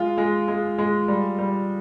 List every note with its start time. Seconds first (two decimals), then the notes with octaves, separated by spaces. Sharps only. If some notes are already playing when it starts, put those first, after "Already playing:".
Already playing: G#3 F4
0.18 G#3
0.48 G#3
0.78 G#3
1.08 G3
1.38 G3